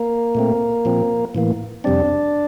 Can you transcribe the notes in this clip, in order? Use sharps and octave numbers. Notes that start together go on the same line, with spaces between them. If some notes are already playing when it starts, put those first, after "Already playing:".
Already playing: A#3 A#4
A#2 A3 C4
A#2 F3 C4
A2 E3 A#3
F2 C3 G3 C4 D4 D5